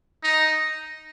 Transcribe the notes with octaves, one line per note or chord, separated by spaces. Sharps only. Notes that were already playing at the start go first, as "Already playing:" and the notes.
D#4